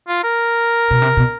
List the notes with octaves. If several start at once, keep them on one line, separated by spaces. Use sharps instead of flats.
F4
A#4
B2
C3
B2